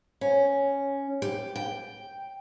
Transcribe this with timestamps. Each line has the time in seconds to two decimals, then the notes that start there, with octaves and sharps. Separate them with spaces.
0.21 C#4
1.22 G4
1.56 G5